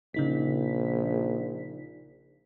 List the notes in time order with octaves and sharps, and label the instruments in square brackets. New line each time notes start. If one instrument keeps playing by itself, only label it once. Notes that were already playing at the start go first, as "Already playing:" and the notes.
[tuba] A#1 [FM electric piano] C#3 D#4 B6